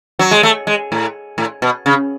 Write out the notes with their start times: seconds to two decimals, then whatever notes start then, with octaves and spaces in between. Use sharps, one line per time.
0.19 F#3
0.31 G#3
0.43 A3
0.67 G#3
0.92 A2
1.38 A2
1.62 B2
1.86 C#3